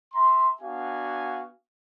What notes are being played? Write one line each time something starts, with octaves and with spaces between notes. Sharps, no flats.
E5 A#5 C6
B3 D4 F#4 F5 G#5